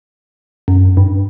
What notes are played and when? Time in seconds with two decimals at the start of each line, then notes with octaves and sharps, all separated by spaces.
0.68 F#2
0.97 G2